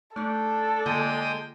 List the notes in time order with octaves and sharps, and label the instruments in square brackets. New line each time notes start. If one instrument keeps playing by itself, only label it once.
[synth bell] A3 D#4 [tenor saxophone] D4 [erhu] A4
[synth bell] D3 A#3 F4 [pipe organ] G#3 G5 D#6